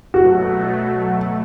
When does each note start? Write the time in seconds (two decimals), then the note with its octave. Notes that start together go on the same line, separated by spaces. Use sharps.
0.14 B2 F#3 A3 F#4